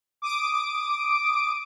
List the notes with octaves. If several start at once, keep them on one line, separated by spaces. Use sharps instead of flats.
D6 D#6 D7